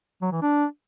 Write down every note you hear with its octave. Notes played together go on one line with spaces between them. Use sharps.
F#3
E3
D4